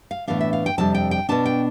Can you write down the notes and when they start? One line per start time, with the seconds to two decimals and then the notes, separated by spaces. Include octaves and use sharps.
0.11 F5
0.27 A2 E3 B3 D4 F5
0.41 E5
0.53 F5
0.66 G5
0.78 F2 C3 G3 D4 A5
0.95 G5
1.11 G5
1.29 B2 B3 D4 A5
1.46 G5